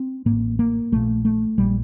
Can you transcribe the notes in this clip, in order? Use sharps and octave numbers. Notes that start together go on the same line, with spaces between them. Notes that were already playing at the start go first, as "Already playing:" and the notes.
Already playing: C4
A1 A2 A#3
A#3
A#1 A#2 A3
A3
A#1 A#2 G3